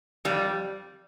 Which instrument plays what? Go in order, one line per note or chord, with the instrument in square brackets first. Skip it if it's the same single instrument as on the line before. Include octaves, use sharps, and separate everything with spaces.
[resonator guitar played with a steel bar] F2 G3